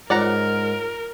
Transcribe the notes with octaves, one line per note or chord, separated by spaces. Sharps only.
G#2 F4 A#4 C#5 D5 F#5 A#5